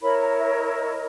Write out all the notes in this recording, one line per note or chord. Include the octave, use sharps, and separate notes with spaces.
E4 A#4 C#5 B5
A#5
E5
D#5
D#5